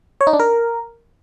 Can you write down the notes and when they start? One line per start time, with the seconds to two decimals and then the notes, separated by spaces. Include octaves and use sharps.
0.21 C#5
0.27 D#4
0.33 D4
0.40 A#4